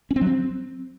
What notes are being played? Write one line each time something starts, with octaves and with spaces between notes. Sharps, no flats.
C#4
C4
F#3
C4